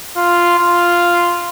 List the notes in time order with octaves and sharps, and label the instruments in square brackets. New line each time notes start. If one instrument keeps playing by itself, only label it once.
[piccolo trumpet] F4
F4